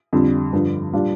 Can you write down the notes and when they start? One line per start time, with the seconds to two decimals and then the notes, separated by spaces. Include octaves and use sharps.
0.13 F2 D3 G3
0.53 G2 D3 F3
0.93 A#2 G3 D4 F4